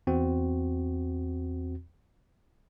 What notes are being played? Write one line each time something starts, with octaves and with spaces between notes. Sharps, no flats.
E2 C4 F#4